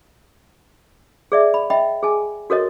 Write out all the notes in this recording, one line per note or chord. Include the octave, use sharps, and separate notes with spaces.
G#4 D5 E5
B5
D#5 E5 G5 B5
G#4 G#5
F#4 A4 A#4 C#5 D#5